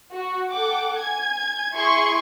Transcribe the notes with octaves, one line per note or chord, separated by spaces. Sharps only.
F#4
A4 F#5 G5 D6
G#5 G#6
E4 G#4 C6 C#6 G#6